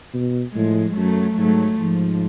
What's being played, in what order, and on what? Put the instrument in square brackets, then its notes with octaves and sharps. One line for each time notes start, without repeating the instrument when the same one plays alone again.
[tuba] B2
[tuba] A2 [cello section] F3 G#3
[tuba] F#2 [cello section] F#3 A3
[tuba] G#2 [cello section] F#3 A3
[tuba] G#2 [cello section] F3